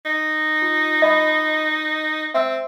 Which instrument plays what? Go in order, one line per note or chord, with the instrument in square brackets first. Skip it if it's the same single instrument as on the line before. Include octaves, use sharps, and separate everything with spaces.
[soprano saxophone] D#4
[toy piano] F4
D#5 B5 D#6
[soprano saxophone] C4 [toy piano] E5 E6